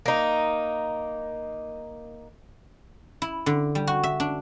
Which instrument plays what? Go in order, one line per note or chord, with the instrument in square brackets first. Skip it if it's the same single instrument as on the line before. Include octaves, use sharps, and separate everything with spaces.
[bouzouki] A#3 D#4
[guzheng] E4
D3
G3
F#4
E5
D4